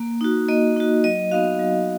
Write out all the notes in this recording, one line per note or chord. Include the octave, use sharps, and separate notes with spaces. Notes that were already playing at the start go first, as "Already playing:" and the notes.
Already playing: A#3
D#4 F#4
A#3 D#5
D#4 F#4
F#3 D#5
B3 D#4 F#4 F5
F#3